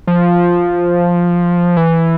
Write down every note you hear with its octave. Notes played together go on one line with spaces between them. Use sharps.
F3
E3